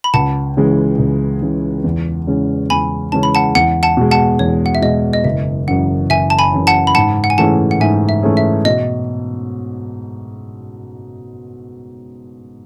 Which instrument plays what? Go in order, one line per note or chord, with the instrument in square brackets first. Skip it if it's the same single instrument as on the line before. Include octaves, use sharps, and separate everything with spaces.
[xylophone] B5
[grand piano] C#2 [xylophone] F#5 A5
[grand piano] C#3 E3 G#3
C#2
C#3 E3 G#3
E2
C#3 E3 G#3 C#4
[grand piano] E2 [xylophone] G#5 B5
[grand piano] C#3 E3 G#3 C#4 [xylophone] A5
[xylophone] B5
F#5 A5
[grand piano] E2 [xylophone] F#5
[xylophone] F#5 A5
[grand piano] B2 G#3
[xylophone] F#5 A5
[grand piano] E2 [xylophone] C#5
[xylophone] F#5
E5
[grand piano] B2 G#3 [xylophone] D#5
[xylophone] D#5
[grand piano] F#1 [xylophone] E5
[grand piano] F#2 C#3 E3 [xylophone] F#5
[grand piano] F#1 [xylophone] E5 G#5
[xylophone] A5
G#5 B5
[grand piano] F#2 C#3 E3
[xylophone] F#5 A5
B5
[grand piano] G#2 [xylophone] F#5 A5
[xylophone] F#5
G#5
[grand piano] E3 A3 C#4 G#4 [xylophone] F#5 A5
[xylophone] F#5
[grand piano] G#2 [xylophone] E5 G#5
[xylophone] E5
[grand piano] E3 A3 C#4 G#4
[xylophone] E5
[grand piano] B2 [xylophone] D#5